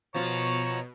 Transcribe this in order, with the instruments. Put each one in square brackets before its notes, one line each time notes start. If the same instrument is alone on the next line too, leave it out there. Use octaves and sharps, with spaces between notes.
[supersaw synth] B2 [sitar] F3 F4 [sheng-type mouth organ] C#5 A#5 [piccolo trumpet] C#6